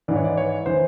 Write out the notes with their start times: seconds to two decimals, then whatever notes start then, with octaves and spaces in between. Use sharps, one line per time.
0.08 G#2 E3 D5
0.16 C#5
0.24 D5
0.37 C#5
0.66 E3 C5